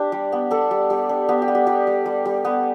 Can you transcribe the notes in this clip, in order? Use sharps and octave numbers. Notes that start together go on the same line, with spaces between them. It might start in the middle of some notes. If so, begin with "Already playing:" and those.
Already playing: D4 G4
G3
B3
D4 A4
G3
G3
D4
B3 G4
G4
B3
G4
G3 G4
G3
G3
G3
B3